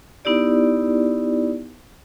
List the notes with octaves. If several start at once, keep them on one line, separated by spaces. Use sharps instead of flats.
B3 D#4 E4 G4 D5